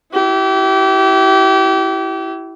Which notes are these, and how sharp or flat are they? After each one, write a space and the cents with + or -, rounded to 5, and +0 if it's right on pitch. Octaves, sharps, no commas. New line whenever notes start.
E4 +0 G4 -35